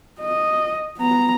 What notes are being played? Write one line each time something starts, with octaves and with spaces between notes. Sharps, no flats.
D#5
B3 A#5